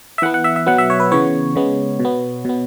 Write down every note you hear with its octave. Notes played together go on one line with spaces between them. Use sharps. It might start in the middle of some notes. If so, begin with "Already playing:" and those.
E5
E3 B3 F#5
F#5
E5
E5
B2 F#3 B3 F#5
E5
C#5
B4
C#3 E3 B3 C#5
C#3 G#3 B3
B2
B3
B2 B3